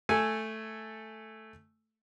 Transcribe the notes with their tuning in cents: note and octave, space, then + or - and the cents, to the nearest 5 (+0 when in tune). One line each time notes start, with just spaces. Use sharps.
A3 +0 A4 +0 G#5 +0